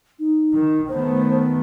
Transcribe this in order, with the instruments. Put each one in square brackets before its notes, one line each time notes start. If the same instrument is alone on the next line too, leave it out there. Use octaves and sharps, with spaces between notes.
[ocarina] D#4
[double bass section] D#3
[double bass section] D#3 A3 B3 [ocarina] C5